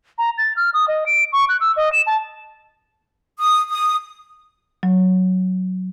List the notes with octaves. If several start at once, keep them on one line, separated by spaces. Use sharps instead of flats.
A#5
A6
F6
D#6
D#5
D7
C#6
F#6
E6
D#5
E7
A5
D#6
D#6
F#3